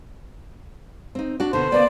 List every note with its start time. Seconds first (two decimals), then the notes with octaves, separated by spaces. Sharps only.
1.15 C4 D#4
1.40 D4 F#4
1.53 B2 D3 C5
1.72 C#3 A#3 B3 D5